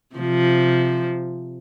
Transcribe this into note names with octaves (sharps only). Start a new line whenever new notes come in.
C3 F3